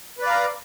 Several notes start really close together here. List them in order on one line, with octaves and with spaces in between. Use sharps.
B4 D5 F5 A#5